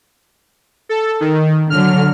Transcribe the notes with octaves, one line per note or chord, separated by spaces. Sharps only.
A4
D#3
D3 F#3 F6